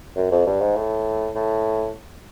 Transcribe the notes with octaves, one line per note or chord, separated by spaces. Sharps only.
F#2
F2
G2
G#2
A2
A2